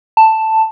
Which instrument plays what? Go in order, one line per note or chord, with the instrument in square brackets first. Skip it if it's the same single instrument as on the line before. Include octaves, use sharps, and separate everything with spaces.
[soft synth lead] A5